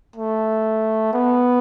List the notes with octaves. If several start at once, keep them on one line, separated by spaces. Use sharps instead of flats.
A3
B3